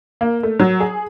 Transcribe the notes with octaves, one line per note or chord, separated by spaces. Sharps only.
A#3
A3
F#3
G#4